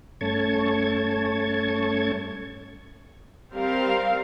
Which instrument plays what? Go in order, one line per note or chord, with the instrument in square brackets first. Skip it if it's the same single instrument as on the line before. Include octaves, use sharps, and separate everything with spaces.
[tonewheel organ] G2 A3 C#4 A5 C#6 G#6
[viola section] G3 C4 G4 A#4 F5